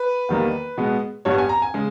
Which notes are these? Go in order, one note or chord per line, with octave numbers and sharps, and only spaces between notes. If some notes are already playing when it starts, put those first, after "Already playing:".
Already playing: B4
E2 D#3 G3 A#3
B2 G#3 B3
G2 G3 B3 C#5
G#5
A#5
G#5
C#3 G#3